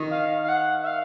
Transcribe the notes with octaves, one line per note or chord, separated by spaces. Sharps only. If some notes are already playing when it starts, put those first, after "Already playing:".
Already playing: D#3 D#4
F5
F5
F#5
E5
F5